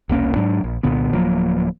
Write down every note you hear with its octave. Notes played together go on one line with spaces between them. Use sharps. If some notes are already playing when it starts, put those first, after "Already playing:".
E1 C2 A#3 C#4
G#2 F#3 D4
A#1
C2 A#2 D3 B3
D1 F3 F#3 A#3